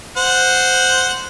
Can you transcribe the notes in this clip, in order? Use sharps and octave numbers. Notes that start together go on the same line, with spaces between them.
C5 F#5